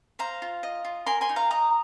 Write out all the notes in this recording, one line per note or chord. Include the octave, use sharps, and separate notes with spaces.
C5 F5 A#5
F4
D#5
F4
A#4 G#5 C6
G#5 C6
D#4
F5 A#5
D#5 A#5 D#6